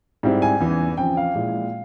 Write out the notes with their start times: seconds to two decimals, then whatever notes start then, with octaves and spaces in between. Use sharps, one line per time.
0.23 G#2 G3 C4 E4
0.42 G#5
0.60 E2 C#3 E3
0.98 C#3 F3 C4 G5
1.17 F5
1.35 A#2 G#3 E4